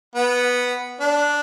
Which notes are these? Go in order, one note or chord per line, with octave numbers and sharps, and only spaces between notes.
B3
D4